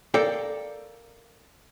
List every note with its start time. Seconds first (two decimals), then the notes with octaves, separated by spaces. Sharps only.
0.14 A4 A#4 D5 F5 G5